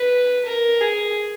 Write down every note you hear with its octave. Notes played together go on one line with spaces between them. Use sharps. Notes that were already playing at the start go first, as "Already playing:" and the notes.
Already playing: B4
A#4
G#4